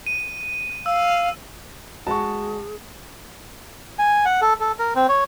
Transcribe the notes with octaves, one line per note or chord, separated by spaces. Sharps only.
D#7
F5 E6
G#3 F#4 G#4 A5 C#6
G#5
F#5
A4
A4
A#4
C4
C#5